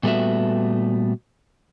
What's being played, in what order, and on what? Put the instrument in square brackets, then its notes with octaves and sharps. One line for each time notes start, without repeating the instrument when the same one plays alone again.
[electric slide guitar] A#2 G3 A3 B3 F#4 E5